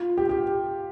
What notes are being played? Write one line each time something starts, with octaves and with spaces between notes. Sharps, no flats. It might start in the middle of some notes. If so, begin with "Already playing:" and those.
Already playing: F4
G4
G4